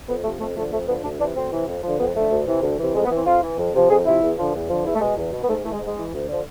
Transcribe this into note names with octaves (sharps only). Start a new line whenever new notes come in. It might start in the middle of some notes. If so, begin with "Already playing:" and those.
F2 B3
C3 F3 A3
F2 A3
D3 F3 A3
F2 A3
D3 F3 B3
D2 D4
C3 E3 D4
D2 C4
C3 E3
F2
D3 F3
F2 B3
D3 F3 A3
D2
C3 E3
D2
C3 E3
F2 G#3
B3
E3
C4
F2 F4
E3
F2
C3 F3
F2 G#4
C3 F3 E4
E2
D3 F3
E2
D3 F3
E2 E4
A3
B2 G#3
E2
B2
B3
G#2 A3
E3 A3
G#3
G#2
G#3
E3
D2
D3 F3